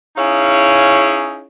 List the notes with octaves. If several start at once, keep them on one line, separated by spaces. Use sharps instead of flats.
C#4 D#4 E4 G#4 C#5 F5